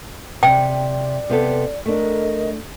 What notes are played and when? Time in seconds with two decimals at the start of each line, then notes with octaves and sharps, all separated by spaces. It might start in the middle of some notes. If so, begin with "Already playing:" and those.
0.43 C3 D5 G5
1.30 C3 B3 A4
1.86 A3 D4 A#4 D#5